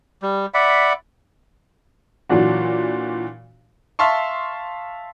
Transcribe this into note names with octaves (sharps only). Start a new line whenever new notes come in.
G3
D5 E5 F#5 B5
A#2 E3 F#3 D4 F#4
E5 F5 A5 C6 C#6